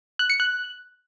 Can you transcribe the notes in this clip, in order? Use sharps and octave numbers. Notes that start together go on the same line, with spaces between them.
F#6
C#7
F#6